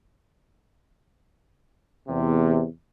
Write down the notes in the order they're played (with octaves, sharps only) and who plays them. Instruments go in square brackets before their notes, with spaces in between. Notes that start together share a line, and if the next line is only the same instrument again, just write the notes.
[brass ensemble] E2 C3